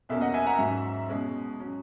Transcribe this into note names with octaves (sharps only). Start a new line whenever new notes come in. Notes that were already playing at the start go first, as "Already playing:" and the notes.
E2 B2 A#3 C#4 E5
D#5 F#5
E5 G#5
F#5 A#5
G#2 F#3 C#4 E5
B2 G#3 C#4
F#3 C#4